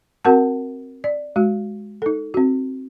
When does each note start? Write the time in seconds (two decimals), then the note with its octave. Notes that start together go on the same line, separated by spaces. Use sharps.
0.25 C4 F#4 A#4 F#5 A5
1.04 D5
1.36 G#3 F#4
2.02 D#4 A4
2.34 C4 F#4